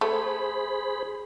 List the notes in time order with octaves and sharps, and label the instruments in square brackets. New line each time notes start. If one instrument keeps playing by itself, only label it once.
[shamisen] A3 [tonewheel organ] G#4 C5 B5